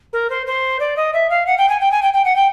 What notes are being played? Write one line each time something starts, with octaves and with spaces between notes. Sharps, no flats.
A#4
C5
C5
D5
D#5
E5
F5
F#5
G5
G#5
G5
G#5
G5
G5
F#5
G5